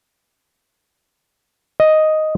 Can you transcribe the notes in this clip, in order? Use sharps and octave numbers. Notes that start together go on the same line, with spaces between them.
D#5